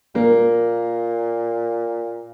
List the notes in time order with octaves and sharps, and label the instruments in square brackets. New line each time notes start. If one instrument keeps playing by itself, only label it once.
[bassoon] A#2 [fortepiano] A#3